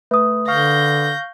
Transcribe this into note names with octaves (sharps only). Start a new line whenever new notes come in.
A3 B4 D#6
D3 F5 C#6 F6 G6 A#6